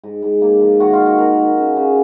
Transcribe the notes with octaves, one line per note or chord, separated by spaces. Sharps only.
G#2
G#2
A#3
F3
D#3 F#4
F4
D#3
F#4
D#4 A#4
A#3
C#3
C#3